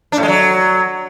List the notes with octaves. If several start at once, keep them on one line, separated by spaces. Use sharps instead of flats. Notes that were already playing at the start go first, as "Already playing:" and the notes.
D4
A2
G#3
F#3